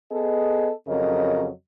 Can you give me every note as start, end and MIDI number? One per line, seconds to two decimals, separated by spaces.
0.12 0.71 59
0.12 0.71 68
0.12 0.71 69
0.12 0.71 75
0.88 1.49 41
0.88 1.49 49
0.88 1.49 54
0.88 1.49 70
0.88 1.49 75